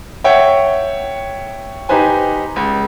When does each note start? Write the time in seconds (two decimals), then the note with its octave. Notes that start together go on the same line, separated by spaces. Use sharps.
0.24 C#5 E5 F#5 G5
1.89 D#4 G4 B4 C5 G#5
2.56 C#2